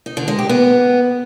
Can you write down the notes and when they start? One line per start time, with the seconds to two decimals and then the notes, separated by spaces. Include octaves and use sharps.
0.06 D#4
0.17 D3
0.28 G#3
0.39 G4
0.49 B3